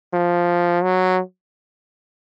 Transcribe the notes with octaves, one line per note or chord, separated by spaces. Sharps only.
F3
F#3